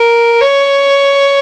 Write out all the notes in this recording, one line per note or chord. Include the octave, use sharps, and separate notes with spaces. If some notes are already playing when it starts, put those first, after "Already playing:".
Already playing: A#4
C#5